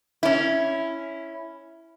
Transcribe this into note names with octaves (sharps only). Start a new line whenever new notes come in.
C#4 E4